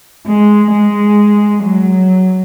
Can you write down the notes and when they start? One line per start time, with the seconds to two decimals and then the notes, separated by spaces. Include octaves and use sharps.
0.27 G#3
0.73 G#3
1.65 F#3